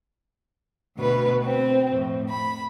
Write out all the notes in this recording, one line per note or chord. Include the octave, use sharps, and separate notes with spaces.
D2 B2 B3 B4
C4
F2 A2
B5